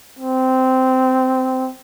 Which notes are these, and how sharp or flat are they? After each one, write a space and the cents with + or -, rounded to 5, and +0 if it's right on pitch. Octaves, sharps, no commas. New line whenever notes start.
C4 -15